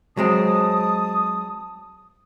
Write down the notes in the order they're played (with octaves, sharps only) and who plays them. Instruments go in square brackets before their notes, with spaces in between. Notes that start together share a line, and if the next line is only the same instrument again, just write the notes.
[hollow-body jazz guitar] F#3 G#3 C4 [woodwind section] A5 D#6